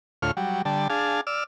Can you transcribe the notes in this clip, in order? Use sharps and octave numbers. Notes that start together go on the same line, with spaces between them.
D2 A2 F4 C#5 F6
F#3 G3
D3 G3 A5
D4 G#4 F5 A5
D5 E6 F6